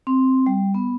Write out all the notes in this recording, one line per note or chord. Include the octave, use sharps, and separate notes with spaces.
C4
G3
B3